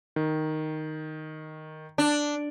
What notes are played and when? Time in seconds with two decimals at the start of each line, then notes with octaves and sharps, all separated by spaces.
0.16 D#3
1.98 D4